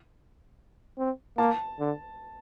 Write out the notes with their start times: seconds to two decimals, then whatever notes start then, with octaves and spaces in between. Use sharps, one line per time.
0.98 C4
1.38 A#3 A5
1.79 D3